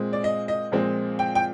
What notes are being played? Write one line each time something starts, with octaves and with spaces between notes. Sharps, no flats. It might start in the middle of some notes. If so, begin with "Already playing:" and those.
Already playing: A#2 G#3 C4
D5
D#5
D#5
A#2 F3 G#3 C4
G5
G5